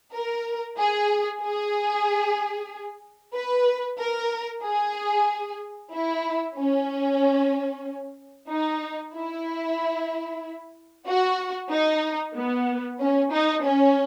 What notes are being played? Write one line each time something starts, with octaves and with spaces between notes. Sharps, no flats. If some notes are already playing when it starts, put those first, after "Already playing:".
A#4
G#4
G#4
B4
A#4
G#4
E4
C#4
D#4
E4
F#4
D#4
B3
C#4
D#4
C#4